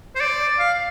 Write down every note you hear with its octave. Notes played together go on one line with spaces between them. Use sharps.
C5
D5
F5